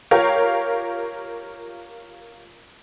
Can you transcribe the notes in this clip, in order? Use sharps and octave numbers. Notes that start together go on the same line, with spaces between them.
F4 G4 A#4 C#5 F5